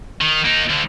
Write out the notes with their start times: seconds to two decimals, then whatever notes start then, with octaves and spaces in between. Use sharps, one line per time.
0.22 D#3
0.45 A#3 D#4
0.70 D2 D3